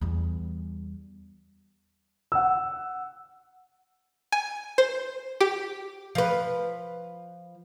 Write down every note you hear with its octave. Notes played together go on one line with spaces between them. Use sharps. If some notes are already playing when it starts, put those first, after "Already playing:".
E2 G3
F#5 E6
G#5
C5
G4
F3 B4